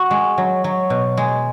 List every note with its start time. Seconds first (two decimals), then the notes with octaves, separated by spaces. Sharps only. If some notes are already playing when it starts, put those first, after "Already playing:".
Already playing: F#4
0.11 G#3
0.38 F#3
0.64 F#3
0.90 B2
1.17 G#3